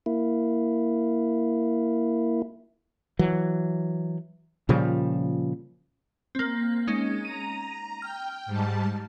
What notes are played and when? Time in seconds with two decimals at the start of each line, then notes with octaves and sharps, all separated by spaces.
0.06 A#3 E4
3.19 E3 F#3
4.69 A#2 C#3 F3 G3
6.35 A#3 C4
6.88 G#3 C#4 D#4
7.25 A#5 D#7
8.02 G5 F6
8.46 G#2 G3 A5